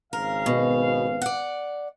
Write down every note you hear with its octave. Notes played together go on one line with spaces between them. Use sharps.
G#1 C#3 A#4 F5
B2
D5 F#5